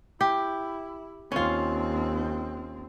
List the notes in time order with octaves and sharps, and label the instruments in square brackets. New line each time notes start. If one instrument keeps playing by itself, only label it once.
[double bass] E4 [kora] G4
[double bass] D#2 C4 [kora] C#4 F4